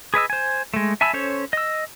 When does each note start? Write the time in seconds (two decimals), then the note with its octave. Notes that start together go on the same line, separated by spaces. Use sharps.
0.14 G#4 B4 D#5 E6
0.30 C5 G#5
0.74 G#3 A3
1.01 E5 G#5 A5 B5 E6
1.13 C#4 A4 C5 C#5
1.53 D#5 E6